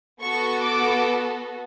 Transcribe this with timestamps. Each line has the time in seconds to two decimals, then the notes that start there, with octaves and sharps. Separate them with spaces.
0.21 B3 F#4 A4 C#6
0.64 D6